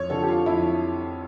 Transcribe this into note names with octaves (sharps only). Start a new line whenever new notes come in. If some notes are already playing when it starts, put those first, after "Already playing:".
Already playing: F2 C#5
D3 F3 A4
G4
F4
F2 E4